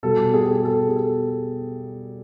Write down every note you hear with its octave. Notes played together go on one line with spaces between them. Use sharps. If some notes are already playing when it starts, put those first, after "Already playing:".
B2 G3 A4
G#4
G4
G#4
A4
G#4
A4